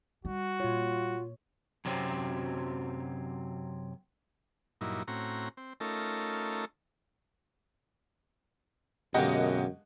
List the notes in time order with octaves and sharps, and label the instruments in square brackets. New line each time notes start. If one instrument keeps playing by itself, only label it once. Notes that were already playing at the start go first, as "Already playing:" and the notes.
[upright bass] G3 [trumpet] F#4
[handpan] A#2 C#5 [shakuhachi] F4
[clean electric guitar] F#2 C3 F#3 C4
[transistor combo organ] G2 A#2 F#3 D#4 E4
A2 C4 C#4 F#4 A#5
C4
A3 C#4 D#4 F4 A4 A#4
[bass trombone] F#2 [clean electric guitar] B2 [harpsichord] D3 G#3 A#3 [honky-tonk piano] G4 D#5 F#5